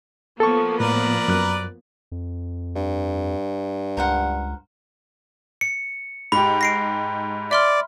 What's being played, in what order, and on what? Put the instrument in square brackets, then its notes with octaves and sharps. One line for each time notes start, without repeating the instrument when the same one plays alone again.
[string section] F3 A#3 B3 [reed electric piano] A4 A5 C#6
[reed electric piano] A2 [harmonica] A#4 B4 D5
[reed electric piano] F#2 F#6
[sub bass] F2
[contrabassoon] G2
[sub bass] C#2 [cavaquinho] A#4 C5 F#5
[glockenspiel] C#7
[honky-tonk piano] G#2 G4 [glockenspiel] B5
[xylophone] A#6 C7 D7
[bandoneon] D5 [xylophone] E5 C6 F6